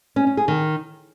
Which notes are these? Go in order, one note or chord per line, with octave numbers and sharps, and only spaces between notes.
C#4
C#4
G#4
D#3